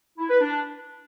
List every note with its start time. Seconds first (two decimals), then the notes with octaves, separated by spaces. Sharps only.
0.18 E4
0.29 B4
0.40 D4